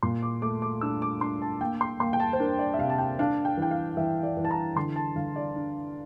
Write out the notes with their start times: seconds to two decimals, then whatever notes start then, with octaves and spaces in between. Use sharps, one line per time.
0.03 A#2 C6
0.23 D6
0.42 A3 D6
0.62 D6
0.81 D4 E6
1.02 D6
1.21 D4 C6
1.42 A5
1.61 A#3 G5
1.81 C6
2.00 A#3 C6
2.13 G5
2.20 A5
2.33 C5
2.40 D4 A#4
2.59 D5
2.74 E5
2.79 C3 F5
2.90 A5
2.98 G5
3.19 D4 F5
3.45 G5
3.57 E3 G5
3.71 F5
3.97 E3 E5
4.23 D5
4.37 E3
4.45 A5
4.51 A#5
4.76 D3 C6
4.96 A5
5.16 D3 F5
5.36 D5
5.56 D4